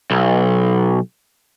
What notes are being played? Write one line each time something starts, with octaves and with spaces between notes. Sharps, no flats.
B1